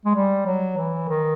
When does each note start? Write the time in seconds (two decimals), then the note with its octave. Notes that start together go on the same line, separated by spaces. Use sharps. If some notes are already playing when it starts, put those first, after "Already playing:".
0.05 G#3
0.15 G3
0.46 F#3
0.77 E3
1.09 D#3